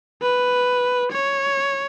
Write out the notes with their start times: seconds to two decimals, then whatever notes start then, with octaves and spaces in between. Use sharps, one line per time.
0.22 B4
1.12 C#5